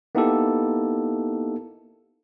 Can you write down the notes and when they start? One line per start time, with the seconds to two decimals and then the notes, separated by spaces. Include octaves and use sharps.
0.15 A#3 B3 D#4 E4 G4 A4